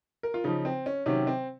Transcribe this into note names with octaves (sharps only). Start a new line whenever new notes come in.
A#4
F4
C#3 F3 D#4
C4
C#4
C3 D#3 F#3 C#4
C4